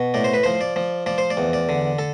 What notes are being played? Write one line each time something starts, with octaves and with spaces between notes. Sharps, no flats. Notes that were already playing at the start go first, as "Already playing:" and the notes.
Already playing: B2
A2 D5
C5
B4
F3 C5
D5
F3
F3 D5
C5
D5
E2
D5
D3
A4